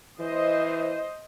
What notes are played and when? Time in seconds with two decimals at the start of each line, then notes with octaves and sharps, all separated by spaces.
0.20 E3 C5 D#5